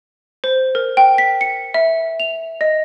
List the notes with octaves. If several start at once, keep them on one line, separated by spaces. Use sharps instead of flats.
C5
A#4
G5
B6
C#7
E5
F7
D#5